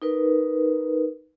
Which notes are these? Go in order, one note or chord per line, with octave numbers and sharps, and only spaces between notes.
D#4 A#4 B4